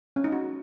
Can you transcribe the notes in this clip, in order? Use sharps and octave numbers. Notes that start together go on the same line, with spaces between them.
C#4
D#4
F#4